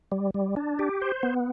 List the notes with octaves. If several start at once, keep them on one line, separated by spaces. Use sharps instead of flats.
G3
G3
D4
G4
C5
B3